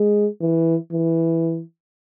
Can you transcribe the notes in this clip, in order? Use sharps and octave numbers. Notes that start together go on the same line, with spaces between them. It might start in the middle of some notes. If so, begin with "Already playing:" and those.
Already playing: G#3
E3
E3